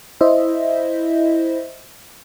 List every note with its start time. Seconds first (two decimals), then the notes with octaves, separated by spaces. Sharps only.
0.21 E4 C5 D#5 E5